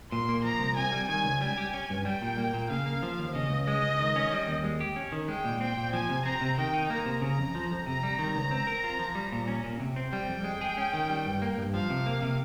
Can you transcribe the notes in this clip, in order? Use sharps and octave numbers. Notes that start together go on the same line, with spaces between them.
A#2 C6
A#3
F3 A#5
C2
C3 G#5
G3
D#3 G#5
C#2
G3 G#5
G4
C#4
G2
G3 G5
A#2
A#3
A#2
C#3 F5
A#3
F3
D#2
C#3 D#5
C#2
G#3 D#5
C#2
D#3
C#4
G3
D#2
G#3
G4
C#4
D#3
G#3 G5
A#2
C4 G5
A#2
F3 G#5
C3
C4 A#5
C3
D#3 G5
D#4
A#3 A#5
C3
C#3 A#5
F2
F3
F2
C3 A#5
G3
D#3
C#2
C4
A#4
F4
F3
G3
A#2
C#4
A#2
C3
C4
G3 G5
F2
G#3
G#4
C#4
D#3
G3
G2
A#3
G2
F3 F5
C3
A#3
C3